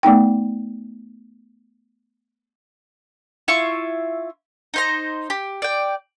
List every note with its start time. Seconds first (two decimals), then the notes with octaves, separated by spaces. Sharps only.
0.03 A3 B3 D#4 G5
3.48 E4 F4 E5 C#6
4.74 D#4 C5 A#5
5.30 G4
5.62 D5 G5